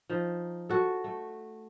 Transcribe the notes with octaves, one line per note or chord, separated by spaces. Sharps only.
F3 D#4
F#4 A4
A3